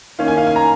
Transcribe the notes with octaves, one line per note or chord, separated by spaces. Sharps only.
D#3 A#3 C#4 F5
G#5
F5
G#5
A#5